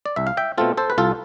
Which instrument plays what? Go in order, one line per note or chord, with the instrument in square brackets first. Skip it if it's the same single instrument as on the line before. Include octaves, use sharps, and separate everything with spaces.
[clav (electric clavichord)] D5
C2 E5
F5
E5 G5
B2 A3 C4 F4 A4
A4 C5
B4
C2 F4 A4